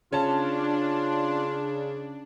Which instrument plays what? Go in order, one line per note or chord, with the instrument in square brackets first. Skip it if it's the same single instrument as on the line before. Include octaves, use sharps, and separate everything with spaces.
[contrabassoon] C#3 [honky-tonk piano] C#4 A5 [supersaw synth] D4 [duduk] F4